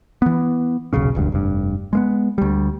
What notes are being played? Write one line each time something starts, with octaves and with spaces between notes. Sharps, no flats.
E3 B3
D#1 B1 C#3 C#4
E1 D2 G2
F1 G2
G#3 A#3 B3
D2 G3